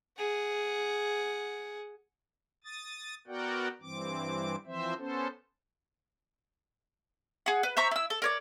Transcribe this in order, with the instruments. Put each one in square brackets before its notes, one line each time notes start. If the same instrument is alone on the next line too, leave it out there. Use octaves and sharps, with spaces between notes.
[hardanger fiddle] G#4 F#5
[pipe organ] D#6 A6
B3 F#4 A#4 D5 F#5 G5
G2 E3 C4 D6
E3 F3 C4 C5 E5
B3 C#4 A4 C5
[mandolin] G#4 F#5
B4
C5 E5 A#5 C#6
E4 E6
A4
A#4 C#5 D5